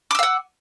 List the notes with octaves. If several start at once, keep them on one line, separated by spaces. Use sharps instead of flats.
F5 F#5 D6 E6